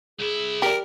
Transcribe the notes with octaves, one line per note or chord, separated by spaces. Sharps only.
C2 E4 G#4
G4 A#4 D5